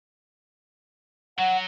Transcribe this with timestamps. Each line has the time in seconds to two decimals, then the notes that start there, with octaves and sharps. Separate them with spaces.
1.38 F#3 F#5